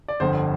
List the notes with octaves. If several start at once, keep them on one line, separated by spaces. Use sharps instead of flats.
D5
G1 F2 D3 C5